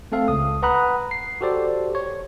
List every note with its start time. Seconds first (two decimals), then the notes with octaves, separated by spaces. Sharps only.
0.12 A3 C4 A4 F5
0.28 C#2 D#6
0.62 B4 F#5 A#5 B5 D#6 F#6
1.11 C7
1.41 F#4 G4 A4 C5 D5
1.95 C#5